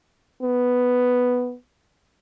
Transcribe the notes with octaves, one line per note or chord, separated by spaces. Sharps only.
B3